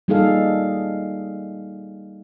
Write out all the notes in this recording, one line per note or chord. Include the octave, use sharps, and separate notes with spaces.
G3 A#3 D#4 G#4 A4 F5